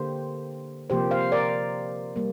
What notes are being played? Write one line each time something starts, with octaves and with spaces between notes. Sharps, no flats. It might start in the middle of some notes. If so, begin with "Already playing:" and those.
Already playing: D3 A#3 G4 C5
C3 F3 A#3 G4 C5
C5 F5
A#4 D5
G3 A#3